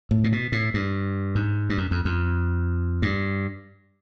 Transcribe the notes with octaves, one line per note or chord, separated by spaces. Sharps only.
A2
A#2
B2
A2
G2
G#2
G2
F#2
F2
F2
G2